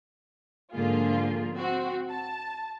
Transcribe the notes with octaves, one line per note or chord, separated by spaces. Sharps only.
G#2 D3 F3 A#3 F4 G#4
C4 F#4
A5